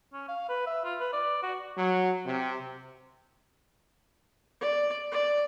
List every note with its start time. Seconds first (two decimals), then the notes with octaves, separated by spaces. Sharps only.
0.13 C#4
0.28 F5
0.49 B4
0.66 E5
0.84 F4
1.00 B4
1.13 D5
1.43 F#4
1.77 F#3
2.25 C3
4.61 D5
5.12 D5